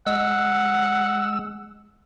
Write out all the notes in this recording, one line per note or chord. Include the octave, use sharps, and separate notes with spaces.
G#3 F#5 E6